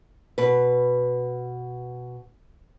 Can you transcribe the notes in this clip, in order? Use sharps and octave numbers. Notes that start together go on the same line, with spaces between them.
B2 B4